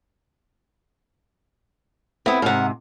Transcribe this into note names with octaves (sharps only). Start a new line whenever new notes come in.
B3 C4 E4 D#6
G#2 C3 A#4 F#5